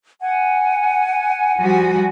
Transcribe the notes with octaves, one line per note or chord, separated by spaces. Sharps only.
F#5 G#5
F3 G3 F#4